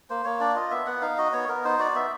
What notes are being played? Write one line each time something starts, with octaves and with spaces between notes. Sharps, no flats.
A#3 C5
A#3 C#5
D4 D5
F4 D#5
B3 E5
B3 F#5
D#4 F5
F#4 D#5
B3 C#5
B3 A#4
D#4 C5
F#4 D5
B3 E5